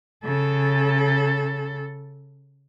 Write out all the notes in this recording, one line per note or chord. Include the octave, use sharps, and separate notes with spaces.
C#3 A4